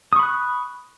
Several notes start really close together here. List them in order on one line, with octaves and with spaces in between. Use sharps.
D#6 C#6 B5 F#6